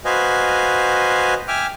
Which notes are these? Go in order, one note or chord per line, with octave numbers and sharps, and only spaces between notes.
F#4 B4 C5 D#5 F5 G#5
E5 G5 G#5 D6 F6